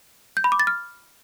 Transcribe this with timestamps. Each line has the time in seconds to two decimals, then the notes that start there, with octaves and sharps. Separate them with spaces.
0.37 G6
0.44 B5
0.52 D6
0.60 A6
0.67 F6